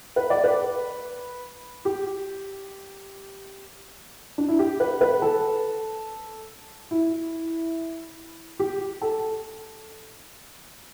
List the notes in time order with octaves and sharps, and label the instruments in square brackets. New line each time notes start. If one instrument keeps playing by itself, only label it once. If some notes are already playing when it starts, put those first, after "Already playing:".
[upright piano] B4
D5
B4
G4
D4
E4
G4
B4
B4
A4
E4
G4
A4